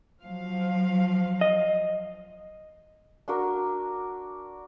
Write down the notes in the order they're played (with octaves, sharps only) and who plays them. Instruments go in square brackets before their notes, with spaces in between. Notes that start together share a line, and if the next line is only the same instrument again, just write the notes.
[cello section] F3 F#3 F5
[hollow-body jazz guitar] D#5
[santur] D4 F#4 A#4